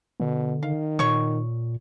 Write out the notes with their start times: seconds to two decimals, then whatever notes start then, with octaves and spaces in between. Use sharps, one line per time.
0.20 B2 D3
0.63 D#3 F5
0.99 A#2 C#5 C#6